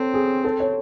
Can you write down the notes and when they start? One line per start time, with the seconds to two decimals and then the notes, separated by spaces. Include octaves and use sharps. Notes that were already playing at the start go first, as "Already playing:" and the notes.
Already playing: C4 A4 C#5
0.14 G#4
0.45 A4
0.60 C#5